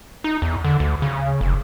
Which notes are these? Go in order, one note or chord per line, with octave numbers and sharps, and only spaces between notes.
D#4
E2
D3
D2
C#3
F1